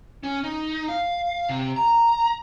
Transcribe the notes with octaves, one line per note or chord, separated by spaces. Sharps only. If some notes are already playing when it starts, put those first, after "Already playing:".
C#4
D#4
F5
C3
A#5